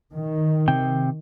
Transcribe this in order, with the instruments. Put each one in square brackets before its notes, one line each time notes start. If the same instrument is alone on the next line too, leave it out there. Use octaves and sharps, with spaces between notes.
[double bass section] D#3
[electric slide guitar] C3 G5